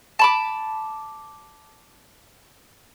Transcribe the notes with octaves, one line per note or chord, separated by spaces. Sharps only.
A5 B5 D6